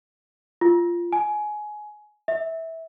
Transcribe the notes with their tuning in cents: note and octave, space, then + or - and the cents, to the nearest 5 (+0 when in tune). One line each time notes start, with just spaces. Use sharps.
F4 -15
G#5 +20
E5 -15